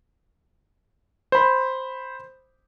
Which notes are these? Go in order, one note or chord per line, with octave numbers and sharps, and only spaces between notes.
C5 B5